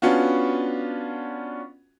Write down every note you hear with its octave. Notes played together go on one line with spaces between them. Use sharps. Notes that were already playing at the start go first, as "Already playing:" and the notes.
B3 C#4 D4 F4 F#4